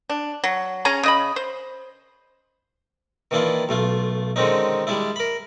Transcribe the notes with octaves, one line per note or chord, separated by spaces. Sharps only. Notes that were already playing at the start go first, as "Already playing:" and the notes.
D4
F#3
C#4 G#4 G#5 A#5
C#3 D#5 B5
C5
D#3 E3 A#3 D4 E4 F4
B1 A3 F4
D3 D#3 G#3 C4 C#4 D#4
G3 G#3 D4 E4
A#4 B5